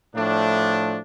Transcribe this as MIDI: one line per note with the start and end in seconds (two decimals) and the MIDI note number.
0.16 0.98 45
0.16 0.98 53
0.16 0.98 57
0.16 0.98 62